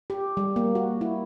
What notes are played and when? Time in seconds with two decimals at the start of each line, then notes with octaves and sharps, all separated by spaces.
0.10 G4
0.37 G3
0.56 A#3
0.75 F#4
1.01 E4